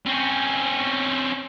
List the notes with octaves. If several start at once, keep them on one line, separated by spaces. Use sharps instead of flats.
C4 C#4